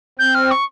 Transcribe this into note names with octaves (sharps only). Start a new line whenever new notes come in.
C4 G6
F6
C#6